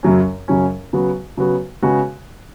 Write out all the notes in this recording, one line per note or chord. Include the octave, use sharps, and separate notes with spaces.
F#2 C#3 F#3 C#4
F#2 C#3 F#3 C#4
C#3 F#3 B3 F#4
C#3 F#3 B3 F#4
C#3 G#3 B3 F#4